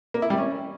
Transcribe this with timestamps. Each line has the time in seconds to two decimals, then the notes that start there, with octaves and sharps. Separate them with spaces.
0.14 A#3
0.22 E4
0.30 G3
0.38 C#4